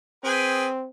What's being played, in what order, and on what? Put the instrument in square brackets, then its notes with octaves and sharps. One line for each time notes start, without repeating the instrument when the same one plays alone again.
[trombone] C4 [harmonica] G#4 B4 G5